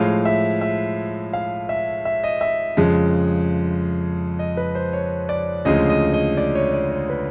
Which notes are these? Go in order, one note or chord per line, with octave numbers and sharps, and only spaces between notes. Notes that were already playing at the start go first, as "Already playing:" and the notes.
Already playing: A2 F3 G#3 F5
E5
E5
F5
E5
E5
D#5
E5
F2 C#3 F3 G#3
D#5
B4
C5
C#5
D5
D2 C#3 F3 G#3 D#5
D#5
D#5
D5
C#5
D5
C#5
B4